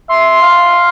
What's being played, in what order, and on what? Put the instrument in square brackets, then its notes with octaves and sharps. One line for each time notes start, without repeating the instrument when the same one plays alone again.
[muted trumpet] E5 [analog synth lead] C6
[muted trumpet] F5